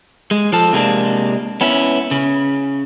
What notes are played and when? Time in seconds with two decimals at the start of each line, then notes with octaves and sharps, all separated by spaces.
0.31 G#3
0.53 F3 A4
0.73 C3 G#3 A#3 D4
1.61 B3 C#4 E4
2.11 C#3